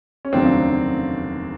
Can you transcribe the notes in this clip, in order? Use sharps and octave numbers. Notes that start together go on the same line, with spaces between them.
C#4
F1 D#2 C#3 F#3 A3 C4 D4